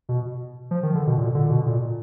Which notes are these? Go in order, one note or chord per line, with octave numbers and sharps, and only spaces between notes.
B2
F3
D#3
D3
B2
A#2
D3
B2
A#2